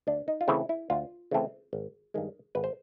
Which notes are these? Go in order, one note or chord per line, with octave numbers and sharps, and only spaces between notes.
D2 D4
D#4
F4
C#3 E3 A3 C4 E4
E4
D2 F4
C#3 E3 A3 C4
G#1
G2 D#3 G#3
G#1 B4
C5